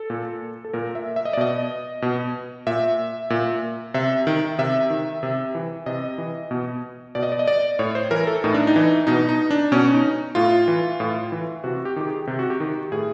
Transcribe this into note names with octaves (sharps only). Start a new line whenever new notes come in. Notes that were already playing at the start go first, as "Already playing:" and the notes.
Already playing: A4
A#2
A4
A#2 A#4
E5
E5
D#5
D5
B2 D#5
B2
A#2 E5
A#2
C3 E5
D#3
C3 E5
D#3
C3
E3
C3 D#5
E3
B2
B2 D5
D#5
D5
D#5
D5
A2 C#5
C5
E3 A#4
A4
A2 D#4
D4
D#4
E3
B2 D#4
D#4
D4
B2 C#4
D#4
A2 F4
E3
A2
E3
C3 F#4
G4
D#3 G4
G#4
C3 G4
F#4
G4
D#3
A2 G#4